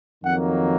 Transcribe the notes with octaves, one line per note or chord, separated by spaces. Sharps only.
F2 D#3 F#3 A#3 F#5